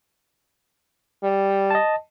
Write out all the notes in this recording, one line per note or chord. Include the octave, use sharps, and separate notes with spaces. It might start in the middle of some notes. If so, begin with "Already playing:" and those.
G3
D#5 A5